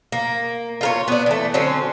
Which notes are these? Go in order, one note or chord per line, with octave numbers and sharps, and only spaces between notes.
A#3
F4 A#4 C#5
B3 D4
E3 A3
D3 F#3 C4 C#4